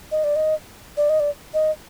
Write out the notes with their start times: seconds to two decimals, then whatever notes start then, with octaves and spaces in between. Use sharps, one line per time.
0.11 D#5
0.24 D5
0.36 D#5
0.97 D5
1.09 D#5
1.20 D5
1.54 D#5